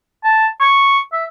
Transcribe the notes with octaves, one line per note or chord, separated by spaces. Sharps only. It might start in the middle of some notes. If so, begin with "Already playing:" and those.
A5
C#6
E5